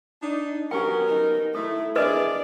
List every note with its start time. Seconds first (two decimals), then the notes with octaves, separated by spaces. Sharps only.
0.22 D4 D#4
0.71 F#3 B3 C#4 G4 A#4 G5
1.08 D#4
1.55 A3 E4 A4
1.96 D4 E4 G#4 A#4 B4 D5 D#5